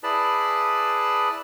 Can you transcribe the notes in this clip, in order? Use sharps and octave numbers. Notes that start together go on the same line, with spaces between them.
E4 G#4 B4 D5 A5 B5